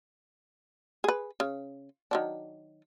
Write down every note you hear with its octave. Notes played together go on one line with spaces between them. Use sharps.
G#4 B4
C#3
D#3 F#3 D4